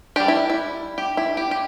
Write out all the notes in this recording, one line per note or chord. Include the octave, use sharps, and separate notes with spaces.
G3 D4 G4
E4
E4
G4
E4
G4
G4